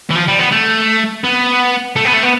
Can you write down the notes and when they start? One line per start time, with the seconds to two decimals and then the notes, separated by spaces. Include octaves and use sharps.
0.10 E3
0.15 F3
0.28 G3
0.39 B3
0.52 A3
1.24 B3
1.96 A3
2.05 B3
2.13 A3
2.23 B3